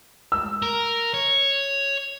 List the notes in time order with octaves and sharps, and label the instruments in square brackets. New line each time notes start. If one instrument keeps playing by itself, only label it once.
[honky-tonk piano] E6
[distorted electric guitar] A#4
C#5